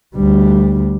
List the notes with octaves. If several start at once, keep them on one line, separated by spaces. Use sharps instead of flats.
D2 G3